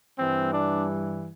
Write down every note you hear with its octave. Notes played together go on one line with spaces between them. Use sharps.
G2 E3 G3 C4
D4